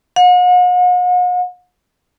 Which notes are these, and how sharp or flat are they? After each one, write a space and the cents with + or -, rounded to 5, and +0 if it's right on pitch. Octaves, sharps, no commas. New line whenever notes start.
F#5 -45